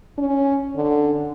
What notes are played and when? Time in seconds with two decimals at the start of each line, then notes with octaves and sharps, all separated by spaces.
0.18 C#4
0.76 D3